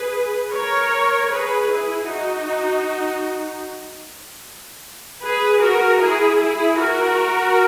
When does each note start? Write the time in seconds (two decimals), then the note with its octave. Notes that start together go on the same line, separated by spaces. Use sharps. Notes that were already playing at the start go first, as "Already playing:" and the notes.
Already playing: G#4 B4
0.52 A#4 C#5
1.31 G#4 B4
1.70 E4 G#4
2.10 D#4 F#4
5.22 G#4 B4
5.62 F#4 A#4
6.01 E4 G#4
6.40 E4 G#4
6.79 F#4 A#4